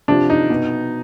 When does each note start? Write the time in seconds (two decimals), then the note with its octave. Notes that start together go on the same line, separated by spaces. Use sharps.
0.08 C3 F3 D4
0.30 D#4
0.50 B2